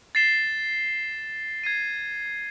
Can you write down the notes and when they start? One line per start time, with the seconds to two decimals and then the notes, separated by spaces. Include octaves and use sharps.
0.15 A6 C7 E7 G7
1.64 G#6 C7 D#7